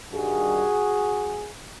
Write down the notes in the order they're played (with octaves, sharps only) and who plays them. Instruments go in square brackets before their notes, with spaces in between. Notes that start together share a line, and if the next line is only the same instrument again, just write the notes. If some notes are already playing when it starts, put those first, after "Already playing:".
[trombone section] G2 D#3 G3 F#4 G#4